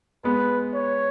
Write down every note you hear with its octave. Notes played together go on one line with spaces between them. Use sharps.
G#3 B3 B4
C#5